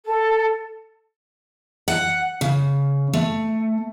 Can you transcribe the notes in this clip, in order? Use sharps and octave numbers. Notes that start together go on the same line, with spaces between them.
A4
F#5
C#3
A3